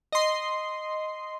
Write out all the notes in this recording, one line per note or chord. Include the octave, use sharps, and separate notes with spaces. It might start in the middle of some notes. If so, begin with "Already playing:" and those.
D#5 C6